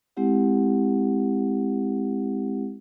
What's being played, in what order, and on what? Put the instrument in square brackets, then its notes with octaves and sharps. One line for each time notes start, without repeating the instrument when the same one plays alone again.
[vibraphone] G#3 C4 E4 G4 F#5